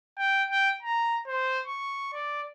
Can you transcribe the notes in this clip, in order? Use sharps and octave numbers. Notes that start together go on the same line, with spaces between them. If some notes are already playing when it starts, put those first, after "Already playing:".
G5
G5
A#5
C5
C#6
D5